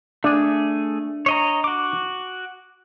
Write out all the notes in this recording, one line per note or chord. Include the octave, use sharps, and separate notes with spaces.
A3 D4 G#4
C#5 D#5 A#5
F#4 D6